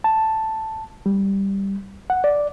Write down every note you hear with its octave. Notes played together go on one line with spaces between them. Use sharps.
A5
G3
F#5
D5